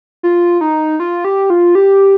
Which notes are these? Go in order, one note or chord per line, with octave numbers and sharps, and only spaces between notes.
F4
D#4
F4
G4
F4
G4